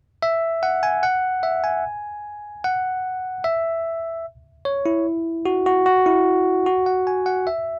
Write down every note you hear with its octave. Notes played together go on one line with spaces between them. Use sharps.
E5
F#5
G#5
F#5
E5
G#5
F#5
E5
C#5
E4
F#4
F#4
F#4
E4
F#4
F#5
G#5
F#5
E5